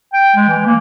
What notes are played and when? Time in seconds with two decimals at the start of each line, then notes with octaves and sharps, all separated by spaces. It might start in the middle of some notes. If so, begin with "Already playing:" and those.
0.14 G5
0.36 G#3
0.49 E3
0.66 A#3